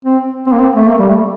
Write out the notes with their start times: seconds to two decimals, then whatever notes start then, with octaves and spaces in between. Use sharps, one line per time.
0.05 C4
0.46 C4
0.52 A#3
0.59 C4
0.75 A3
0.87 A#3
0.99 G3
1.08 A3